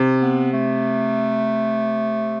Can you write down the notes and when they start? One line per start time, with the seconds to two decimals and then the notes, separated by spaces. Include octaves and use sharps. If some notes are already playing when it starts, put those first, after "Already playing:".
Already playing: C3
0.22 B3
0.53 A3